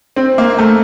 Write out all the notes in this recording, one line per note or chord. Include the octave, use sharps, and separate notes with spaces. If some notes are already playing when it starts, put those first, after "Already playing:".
C4
A#3
A3